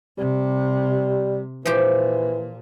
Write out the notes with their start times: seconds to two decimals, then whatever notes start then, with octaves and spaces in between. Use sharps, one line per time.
0.18 C3 G3
1.66 A#2 E3 F3 G4